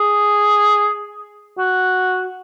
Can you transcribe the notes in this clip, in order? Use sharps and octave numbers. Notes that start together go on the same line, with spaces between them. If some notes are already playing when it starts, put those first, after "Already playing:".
Already playing: G#4
F#4